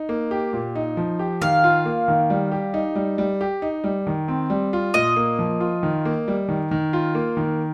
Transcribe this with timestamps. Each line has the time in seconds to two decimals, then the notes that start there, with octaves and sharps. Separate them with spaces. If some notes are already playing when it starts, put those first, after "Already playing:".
Already playing: D#4
0.09 A#3
0.31 G4
0.53 A#2
0.76 D#4
0.97 F3
1.19 G4
1.41 D#3 F5
1.64 F4
1.85 A#3
2.08 D#3
2.30 G3
2.52 G4
2.74 D#4
2.95 G3
3.18 G3
3.41 G4
3.62 D#4
3.84 G3
4.07 D#3
4.28 C4
4.50 G3
4.73 F4
4.94 A#2 D#5
5.16 A#3
5.39 F3
5.60 F4
5.83 D#3
6.05 A#3
6.28 G3
6.49 D#3
6.71 D#3
6.93 F4
7.15 A#3
7.37 D#3